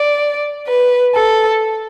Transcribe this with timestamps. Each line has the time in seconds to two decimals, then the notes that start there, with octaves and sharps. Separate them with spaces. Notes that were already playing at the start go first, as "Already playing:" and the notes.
Already playing: D5
0.67 B4
1.15 A4